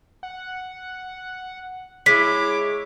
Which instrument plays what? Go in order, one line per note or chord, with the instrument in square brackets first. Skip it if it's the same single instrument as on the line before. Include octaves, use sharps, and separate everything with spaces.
[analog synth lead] F#5
[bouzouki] G#3 [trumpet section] E4 D6 [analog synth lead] C#5 [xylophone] B6